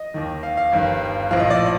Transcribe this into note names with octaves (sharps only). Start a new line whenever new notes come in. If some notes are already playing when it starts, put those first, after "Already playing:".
Already playing: D#5
D#2 D#3
F5
F5
G1 G2 D#3
A#1 A2 F3 F5
D#5
D5